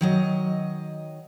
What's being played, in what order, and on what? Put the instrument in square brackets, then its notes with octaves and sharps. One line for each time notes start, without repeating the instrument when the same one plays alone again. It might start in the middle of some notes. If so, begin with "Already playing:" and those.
[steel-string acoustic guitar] D#3 F#3 D#5